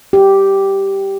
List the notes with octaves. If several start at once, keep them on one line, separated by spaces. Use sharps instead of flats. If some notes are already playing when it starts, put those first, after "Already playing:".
G4